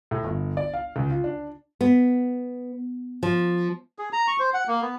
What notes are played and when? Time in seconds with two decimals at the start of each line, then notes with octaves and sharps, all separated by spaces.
0.11 A2
0.24 G1
0.57 D5
0.74 F5
0.96 C#2
1.11 F4
1.24 D4
1.81 B3
3.23 F3
3.99 G#4
4.13 A#5
4.28 C#6
4.39 C5
4.54 F#5
4.67 A#3
4.82 B3